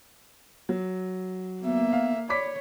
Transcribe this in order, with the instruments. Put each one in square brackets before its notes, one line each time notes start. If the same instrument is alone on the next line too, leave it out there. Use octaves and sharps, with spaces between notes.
[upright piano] F#3
[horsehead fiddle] A#3 E5 [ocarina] B3
[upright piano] F5
[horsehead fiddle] C#5 [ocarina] D5 [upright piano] B5 D6 B6